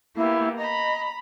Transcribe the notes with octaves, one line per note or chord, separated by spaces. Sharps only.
A#3 B3 E4 G4
D#5 A#5 B5